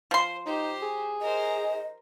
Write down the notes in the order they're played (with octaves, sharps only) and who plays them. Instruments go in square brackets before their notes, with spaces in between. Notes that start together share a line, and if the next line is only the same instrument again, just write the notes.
[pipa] F3 C6 [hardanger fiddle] C5
[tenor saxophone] D#4 [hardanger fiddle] G4 C5
[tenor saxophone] G#4
[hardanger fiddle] A#4 C5 [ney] D#5